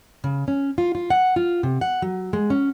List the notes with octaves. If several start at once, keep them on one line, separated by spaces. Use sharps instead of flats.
C#3
C#4
F4
F4
F#5
F4
C3
F#5
F#3
G#3
C#4